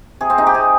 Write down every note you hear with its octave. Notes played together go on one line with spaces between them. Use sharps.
C3 G#4
C4
C3 D#4
G4
C3 G#4